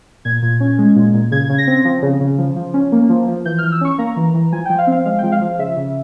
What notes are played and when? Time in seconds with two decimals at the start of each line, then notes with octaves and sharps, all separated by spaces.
0.25 A#2 G#6
0.42 A#2
0.60 C#4
0.79 G#3
0.96 A#2
1.14 A#2
1.32 C#3 G#6
1.49 C#3
1.58 A#6
1.67 C4
1.85 F3
2.02 C#3
2.20 C#3
2.38 F3
2.56 F3
2.74 C#4
2.92 A#3
3.09 F3
3.27 F3
3.45 E3 G6
3.58 E3 F6
3.72 E6
3.81 C#4 C#6
3.98 A#3 A#5
4.16 E3
4.34 E3
4.52 F3 G#5
4.65 F3 G5
4.78 F5
4.87 C4
4.92 F5
5.05 G#3 F5
5.19 F3 G5
5.32 F5
5.41 F3
5.59 C#3 E5
5.77 C#3